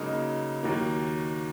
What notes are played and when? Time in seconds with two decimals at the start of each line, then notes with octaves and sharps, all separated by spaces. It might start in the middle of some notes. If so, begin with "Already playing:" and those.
Already playing: C#2 C#3 F#3 A#3 D#4
0.63 D#2 D#3 F#3 A#3